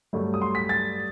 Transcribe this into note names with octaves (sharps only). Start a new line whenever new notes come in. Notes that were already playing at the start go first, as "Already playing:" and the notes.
G2 F#3 A3
D#6
C6
B6
A6